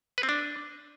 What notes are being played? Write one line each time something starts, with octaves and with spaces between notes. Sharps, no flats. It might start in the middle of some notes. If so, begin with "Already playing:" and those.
B4
C4
D4